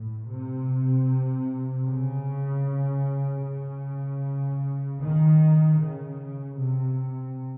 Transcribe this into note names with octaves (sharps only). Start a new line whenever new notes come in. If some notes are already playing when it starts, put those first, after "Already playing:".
Already playing: A2
C3
C#3
C#3
D#3
C#3
C3